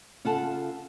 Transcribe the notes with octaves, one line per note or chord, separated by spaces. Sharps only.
C#3 F4 A4 F#5 A5